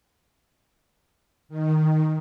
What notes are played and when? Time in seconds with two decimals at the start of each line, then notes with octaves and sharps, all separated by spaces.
1.49 D#3